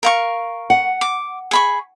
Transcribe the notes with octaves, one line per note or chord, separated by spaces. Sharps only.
A#4 F5 C#6
F#5
D6
G#4 B5 C#6